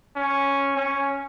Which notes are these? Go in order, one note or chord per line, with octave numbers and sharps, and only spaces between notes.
C#4
C#4